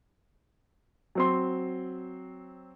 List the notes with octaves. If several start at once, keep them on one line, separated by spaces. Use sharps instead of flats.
F#3 C4 C6